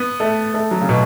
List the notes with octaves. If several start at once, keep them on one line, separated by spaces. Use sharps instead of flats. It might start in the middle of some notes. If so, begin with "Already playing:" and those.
Already playing: B3
A3
A3
F#3
C#3
B2